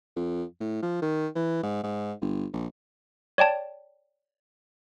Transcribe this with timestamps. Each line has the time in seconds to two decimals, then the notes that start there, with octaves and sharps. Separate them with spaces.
0.16 F2
0.60 A2
0.82 F3
1.02 D#3
1.35 E3
1.63 G#2
1.83 G#2
2.21 G1
2.53 A#1
3.38 C#5 D5 G5 A5